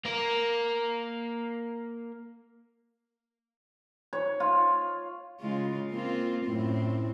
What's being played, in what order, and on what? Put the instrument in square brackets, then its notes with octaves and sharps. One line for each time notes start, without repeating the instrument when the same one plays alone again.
[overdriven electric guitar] A#3 A#4
[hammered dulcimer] C#5
F4
[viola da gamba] C#3 G#3 F4
A#3 C4 F4
F#2 A2 C4